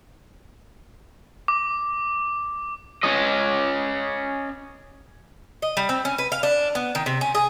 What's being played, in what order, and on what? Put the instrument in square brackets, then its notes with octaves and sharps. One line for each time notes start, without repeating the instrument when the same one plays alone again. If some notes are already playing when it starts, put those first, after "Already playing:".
[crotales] D6
[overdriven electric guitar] C#4 D#5
[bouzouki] D#5
G3
C4
C#4
B4
F5
D4
B3
D#3
C3
C#4
G#4